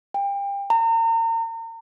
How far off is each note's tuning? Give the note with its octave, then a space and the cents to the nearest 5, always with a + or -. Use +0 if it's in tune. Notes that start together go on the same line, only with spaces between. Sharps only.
G5 +30
A#5 -35